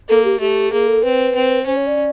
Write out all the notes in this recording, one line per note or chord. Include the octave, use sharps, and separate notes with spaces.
A#3 A4
G4
A3 G4
A#3 G#4
A4
C4 B4
C4
C#4 C5
C#5
D5